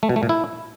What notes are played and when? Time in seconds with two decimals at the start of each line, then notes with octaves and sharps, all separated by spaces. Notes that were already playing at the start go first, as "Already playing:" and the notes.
0.03 A3
0.09 B2
0.16 A3
0.23 A#2
0.29 E4